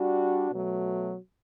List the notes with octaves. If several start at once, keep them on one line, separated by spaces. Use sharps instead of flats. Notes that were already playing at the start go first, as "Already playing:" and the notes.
Already playing: G3 D4 F#4
B2 F#3 A3